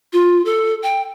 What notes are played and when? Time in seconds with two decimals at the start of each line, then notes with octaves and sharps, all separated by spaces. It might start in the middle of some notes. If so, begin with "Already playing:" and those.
0.13 F4
0.45 A4
0.83 G5